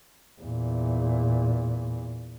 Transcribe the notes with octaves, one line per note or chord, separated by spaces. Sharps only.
E2 A#2